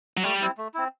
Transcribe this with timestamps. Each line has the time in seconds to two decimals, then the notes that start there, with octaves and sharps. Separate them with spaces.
0.17 F#3
0.23 G3 A3
0.41 C4 E4
0.58 A3
0.74 C4 E4